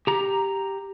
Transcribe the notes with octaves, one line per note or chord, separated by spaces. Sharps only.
G4 A#5